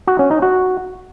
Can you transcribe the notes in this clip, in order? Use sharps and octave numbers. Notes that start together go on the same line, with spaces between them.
F#4
C#4
D#4
F#4